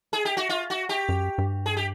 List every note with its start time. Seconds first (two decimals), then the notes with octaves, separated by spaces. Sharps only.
0.13 G#4
0.25 G4
0.37 F#4
0.49 F4
0.70 F#4
0.89 G4
1.09 F#2
1.38 G2
1.66 G#4
1.77 G4